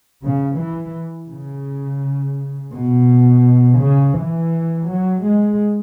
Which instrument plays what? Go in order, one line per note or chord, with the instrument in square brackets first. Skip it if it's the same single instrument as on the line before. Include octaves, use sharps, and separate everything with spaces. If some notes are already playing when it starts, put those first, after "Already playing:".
[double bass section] C#3
E3
C#3
B2
C#3
E3
F#3
G#3